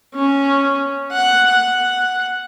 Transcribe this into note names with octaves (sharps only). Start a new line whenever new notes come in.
C#4
F#5
F#5